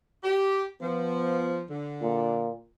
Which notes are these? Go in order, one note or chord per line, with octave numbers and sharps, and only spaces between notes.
G4
F3 B3
D3
A#2